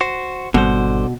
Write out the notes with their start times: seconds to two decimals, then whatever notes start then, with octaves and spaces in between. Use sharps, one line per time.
0.01 F#4 C5
0.54 G#1 B2 D3 G3 C5